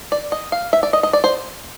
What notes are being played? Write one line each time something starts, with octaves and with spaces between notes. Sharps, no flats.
D5
D#5
F5
E5
D5
D#5
D#5
D5
C5